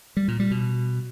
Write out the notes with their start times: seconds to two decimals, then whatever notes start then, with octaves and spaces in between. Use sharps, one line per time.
0.17 G3
0.28 A#2
0.40 G3
0.51 B2